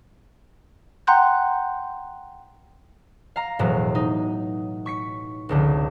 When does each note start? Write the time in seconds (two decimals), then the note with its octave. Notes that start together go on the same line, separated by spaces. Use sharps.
1.07 F#5 G5 A#5 C6 F#6 G6
3.36 F5 A#5
3.59 E1 A2 F#3
3.95 D#4
4.86 C#6 B6 C#7
5.49 F1 C#2 D3